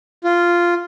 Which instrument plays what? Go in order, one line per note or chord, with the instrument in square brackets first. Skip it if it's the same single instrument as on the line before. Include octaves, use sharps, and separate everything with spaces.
[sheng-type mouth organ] F4